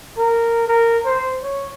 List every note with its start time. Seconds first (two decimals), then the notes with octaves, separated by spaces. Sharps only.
0.17 A#4
0.68 A#4
1.06 C5
1.43 C#5